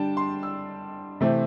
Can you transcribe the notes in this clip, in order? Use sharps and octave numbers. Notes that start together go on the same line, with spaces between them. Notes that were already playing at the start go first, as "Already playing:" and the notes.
Already playing: D3 G3 D4 G5 A5
C6
E6
C3 E3 A3 C4